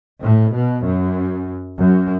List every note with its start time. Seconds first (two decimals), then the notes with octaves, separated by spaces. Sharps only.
0.21 A2
0.52 B2
0.84 F#2
1.77 F#2